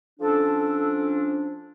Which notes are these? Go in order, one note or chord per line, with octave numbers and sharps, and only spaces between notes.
F3 C#4 D4 A4